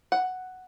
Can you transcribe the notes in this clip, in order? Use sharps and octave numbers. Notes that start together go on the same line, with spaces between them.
F#5